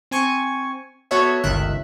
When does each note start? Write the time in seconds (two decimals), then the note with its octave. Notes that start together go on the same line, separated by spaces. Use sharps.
0.11 C4 G#5 C#6
1.11 B3 F#4 A4 C#5 E5
1.43 G1 C#2 D#3 E5 F#6